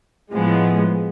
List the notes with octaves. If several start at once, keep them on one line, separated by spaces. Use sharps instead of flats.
A2 F3 G#3 B3